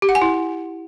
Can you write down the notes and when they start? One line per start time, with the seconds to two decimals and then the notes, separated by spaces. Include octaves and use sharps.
0.02 G4
0.09 F#5
0.15 G#5
0.22 E4